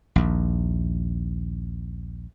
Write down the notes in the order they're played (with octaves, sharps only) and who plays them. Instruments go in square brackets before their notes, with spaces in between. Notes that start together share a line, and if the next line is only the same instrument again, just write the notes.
[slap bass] A#1 D#2